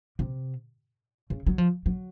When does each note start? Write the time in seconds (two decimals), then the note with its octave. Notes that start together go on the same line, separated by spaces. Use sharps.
0.19 C3
1.30 C#3
1.47 F#3
1.58 F3
1.86 F#3